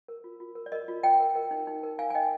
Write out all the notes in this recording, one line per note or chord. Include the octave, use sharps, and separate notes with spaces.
A#4
F4
F4
A#4
D5
A#4 D#5
F4
F4 D#5 G5
A#4
A#4
D#4
D#4
A#4
A#4 F5 G#5
G#5
D#4 D#5 G5